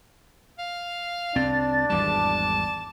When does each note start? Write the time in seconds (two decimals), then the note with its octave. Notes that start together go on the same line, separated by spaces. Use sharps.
0.58 F5
1.36 C2 C4 D4 A6
1.90 G#1 E2 G3 A5 D6